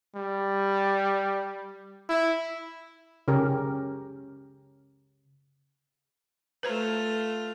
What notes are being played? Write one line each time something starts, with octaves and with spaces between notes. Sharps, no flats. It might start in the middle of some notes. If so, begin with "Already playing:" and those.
G3
E4
C#3 C#4 G4 A#4
A3 F4 B4 C5 A#5